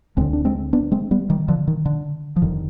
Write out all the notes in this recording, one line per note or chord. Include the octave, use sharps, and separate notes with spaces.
D2 D3 G#3 C4
D4
G#3 C4
B3 D4
G#3 C4
G3 B3
D#3 G3
D3 F3
D#3
D3
F3
F1 F2 D3 D#3